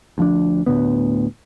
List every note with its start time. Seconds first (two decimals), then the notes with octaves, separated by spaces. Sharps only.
0.18 D2 F3 D4
0.66 D2 A2 D3 B3